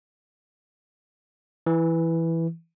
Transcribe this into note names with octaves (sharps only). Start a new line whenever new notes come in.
E3